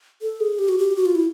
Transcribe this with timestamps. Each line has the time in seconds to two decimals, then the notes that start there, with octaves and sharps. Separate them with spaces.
0.22 A4
0.40 G#4
0.59 G4
0.69 F#4
0.78 G4
0.96 F#4
1.05 F4
1.15 E4